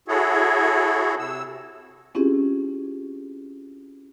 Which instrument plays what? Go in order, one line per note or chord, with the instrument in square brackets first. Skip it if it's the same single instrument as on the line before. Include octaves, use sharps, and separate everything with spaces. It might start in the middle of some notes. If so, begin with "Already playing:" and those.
[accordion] E4 F#4 G#4 A4 C#5
C3 E6
[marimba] C4 C#4 E4 F4 G4 G#4